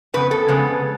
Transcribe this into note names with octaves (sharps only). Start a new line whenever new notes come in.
F2 C#3 B3 B4
A4
F2 C#3 G#3 B3